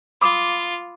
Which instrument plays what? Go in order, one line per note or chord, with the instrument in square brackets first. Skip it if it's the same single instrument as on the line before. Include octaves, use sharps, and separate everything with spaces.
[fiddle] F4 [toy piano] B5 D6 D#6